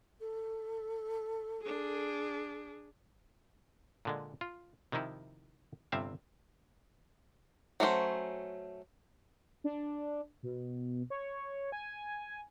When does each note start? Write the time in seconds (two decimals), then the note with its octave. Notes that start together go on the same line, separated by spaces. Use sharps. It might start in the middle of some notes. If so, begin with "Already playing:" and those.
0.20 A4
1.62 D4 G#4
4.05 A#2 D3 G#3
4.41 F4
4.92 C3 D#3 F3 D#4 E4
5.92 G1 G2 C3 C4 E5 F5
7.80 F#3 A3 C#4 F#4 C5
9.64 D4
10.43 B2
11.10 C#5
11.72 G#5